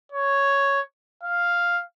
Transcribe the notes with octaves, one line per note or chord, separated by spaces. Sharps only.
C#5
F5